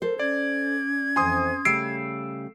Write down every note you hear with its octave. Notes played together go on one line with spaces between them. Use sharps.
A4 A#4 C5
C#4 D5 G#6
F2 E3 C5 G#5 C6 D#6
C#3 G3 A3 E6 C7 D7